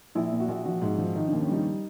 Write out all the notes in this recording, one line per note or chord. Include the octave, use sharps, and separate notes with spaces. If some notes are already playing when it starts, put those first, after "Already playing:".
A#1 E4
A#2
F#4
A#1
F3 F#4
G#2
F3
D#3 D#4
D4
D#2
C#4
G3 D#4